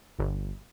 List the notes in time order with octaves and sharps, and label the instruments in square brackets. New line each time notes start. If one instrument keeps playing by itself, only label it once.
[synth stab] G1